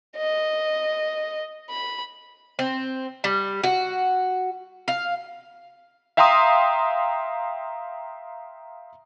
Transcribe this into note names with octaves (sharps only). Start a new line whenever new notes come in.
D#5
B5
C4
G3
F#4
F5
E5 F5 G5 A#5 C6 D#6